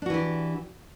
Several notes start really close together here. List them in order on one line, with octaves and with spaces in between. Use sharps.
D4 F#4 E3 G4